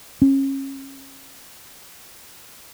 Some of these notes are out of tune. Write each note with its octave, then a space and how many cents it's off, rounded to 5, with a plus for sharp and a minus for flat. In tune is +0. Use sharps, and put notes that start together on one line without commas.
C#4 -30